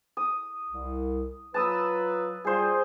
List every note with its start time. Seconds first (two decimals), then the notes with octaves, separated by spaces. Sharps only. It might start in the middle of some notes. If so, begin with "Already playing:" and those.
0.17 D#6
0.69 C2
1.54 F#3 F4 B4 A5 D#6 E6
2.45 G3 F4 G#4 C5